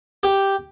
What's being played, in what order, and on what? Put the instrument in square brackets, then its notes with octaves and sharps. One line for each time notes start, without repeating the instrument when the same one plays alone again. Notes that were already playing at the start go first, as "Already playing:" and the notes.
[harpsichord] G4